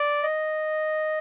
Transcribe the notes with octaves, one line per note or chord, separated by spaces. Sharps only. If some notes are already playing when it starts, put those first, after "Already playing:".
Already playing: D5
D#5